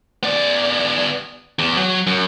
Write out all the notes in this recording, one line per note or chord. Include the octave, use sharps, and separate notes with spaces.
B3 D5
E2
F#3
F#2